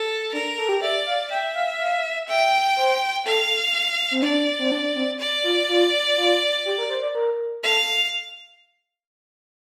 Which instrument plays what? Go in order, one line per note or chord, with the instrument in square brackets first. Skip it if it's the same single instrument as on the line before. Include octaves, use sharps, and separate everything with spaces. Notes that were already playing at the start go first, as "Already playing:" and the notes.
Already playing: [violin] A4
[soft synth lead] D4 [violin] A#4
[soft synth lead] A4
G4
[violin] D5 [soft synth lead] E5
[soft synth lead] F5
[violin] E5 [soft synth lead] G5
[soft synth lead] F5
F5
[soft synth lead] E5 [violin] G5
[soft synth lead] C5
[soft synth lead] A4 [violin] F5
[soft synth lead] C4
[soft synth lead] D4 [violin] D5
[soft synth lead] C4
D4
C4
[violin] D5
[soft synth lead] F4
F4
F4
G4
A#4
C5
D5
A#4
[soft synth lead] A4 [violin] F5